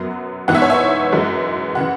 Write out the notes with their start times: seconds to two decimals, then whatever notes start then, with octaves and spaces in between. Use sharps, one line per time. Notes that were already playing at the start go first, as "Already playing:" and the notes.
Already playing: F#2 F#3 B3
0.48 G#2 E3 B3 F#5
0.55 E5
0.62 C#5
0.70 E5
1.12 F#2 E3 G#3
1.75 C#3 E3 F#5